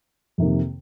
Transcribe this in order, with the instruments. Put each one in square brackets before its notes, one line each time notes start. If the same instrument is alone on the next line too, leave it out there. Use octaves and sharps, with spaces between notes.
[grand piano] F2 C3 D#3 A#3